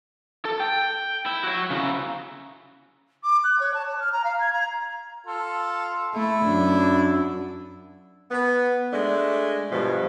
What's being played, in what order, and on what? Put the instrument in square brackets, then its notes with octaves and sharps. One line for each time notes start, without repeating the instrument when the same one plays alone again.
[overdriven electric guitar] A4
G5
E4
F#4 C#5
C#3 E4
[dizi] D6
F#6
C#5
A5
C#5
F6
A#5
F5
G#6
A#5
[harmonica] F4 A4
[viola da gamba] A3 [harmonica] E4
[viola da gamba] F#2 D4
[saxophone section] B3
G#3 A3 D4
G2 B2 F3